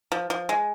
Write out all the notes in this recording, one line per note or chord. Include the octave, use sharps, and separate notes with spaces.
F3
F3
G#3